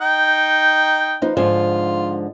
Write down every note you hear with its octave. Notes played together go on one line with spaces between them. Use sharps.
D#4 G5
F3 D#4 B4
G#2 D3 F3 F4